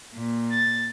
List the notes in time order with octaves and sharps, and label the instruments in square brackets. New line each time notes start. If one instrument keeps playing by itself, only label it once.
[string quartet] A#2
[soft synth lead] A6